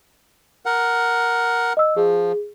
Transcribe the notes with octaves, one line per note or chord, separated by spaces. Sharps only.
A#4 F#5
D#5 E6
F3 G#4